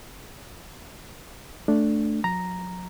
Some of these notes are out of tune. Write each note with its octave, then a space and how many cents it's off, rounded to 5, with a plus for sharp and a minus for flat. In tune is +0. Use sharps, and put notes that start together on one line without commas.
A3 +0 D4 +0
F#3 -40 A#5 +0